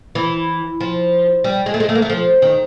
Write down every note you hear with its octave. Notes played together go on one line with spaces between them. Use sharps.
E3
F3
G3
G#3
A3
G#3
A3
A#3
A3
F3
D#3